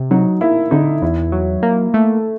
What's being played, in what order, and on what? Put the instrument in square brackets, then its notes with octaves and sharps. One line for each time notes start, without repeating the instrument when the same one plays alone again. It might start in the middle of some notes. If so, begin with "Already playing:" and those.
Already playing: [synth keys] C3
[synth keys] F#3 [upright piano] D#4
[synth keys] A#3 [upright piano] E4
[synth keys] D3 [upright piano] D#4
[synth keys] E2 [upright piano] E4
[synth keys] F#3
A#3
A3